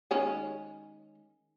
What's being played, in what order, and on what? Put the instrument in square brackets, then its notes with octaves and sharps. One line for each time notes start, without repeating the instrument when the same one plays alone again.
[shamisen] D#3 G#3 C#4